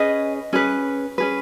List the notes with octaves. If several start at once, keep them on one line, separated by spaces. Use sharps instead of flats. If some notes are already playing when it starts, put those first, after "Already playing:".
Already playing: C#4 G#4 B4 D#5
C#4 G#4 B4
C#4 G#4 B4